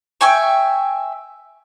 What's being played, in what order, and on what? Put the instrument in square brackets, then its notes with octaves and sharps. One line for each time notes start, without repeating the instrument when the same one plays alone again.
[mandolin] E5 G5 G#5 C#6